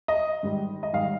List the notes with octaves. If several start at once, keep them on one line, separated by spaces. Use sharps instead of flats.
D#5
G#2 D#3 G3
D#5
G#2 D#3 G3 F5